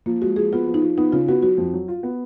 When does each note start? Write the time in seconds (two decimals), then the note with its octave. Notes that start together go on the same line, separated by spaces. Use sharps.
0.06 F3 A#3
0.22 G#3 F#4
0.36 F3 G#4
0.53 B3 F4
0.67 F3
0.74 D#4
0.82 F3
0.98 B3 D#4
1.12 C#3 F4
1.28 B3 F#4
1.42 F#3 F#4
1.58 F2
1.74 F#3
1.88 F4
2.03 B3